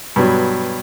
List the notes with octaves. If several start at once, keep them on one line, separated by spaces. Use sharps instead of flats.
G2 B2 F#3